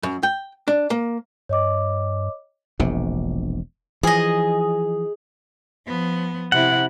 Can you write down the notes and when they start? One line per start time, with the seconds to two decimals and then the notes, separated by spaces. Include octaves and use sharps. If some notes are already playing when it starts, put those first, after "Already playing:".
0.03 F#2
0.23 G5
0.68 D4
0.90 A#3
1.49 G2 C#5 D#5 D6
2.80 E1 A#1 C3
4.03 E3 F3 G#4 D#5
5.86 F3 B3
6.52 C3 E4 F#5